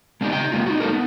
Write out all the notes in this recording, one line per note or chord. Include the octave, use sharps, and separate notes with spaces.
G#3 B3 D4 D#4 G4
C#3 G5 A#5
G#3 A#3 F4
D#4 F#4
G#3 D#4 A4 A#4
B3